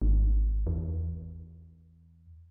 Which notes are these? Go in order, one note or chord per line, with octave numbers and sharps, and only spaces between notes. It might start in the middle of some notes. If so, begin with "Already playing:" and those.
G#1
E2